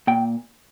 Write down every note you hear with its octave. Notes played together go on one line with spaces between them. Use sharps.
A#2 G5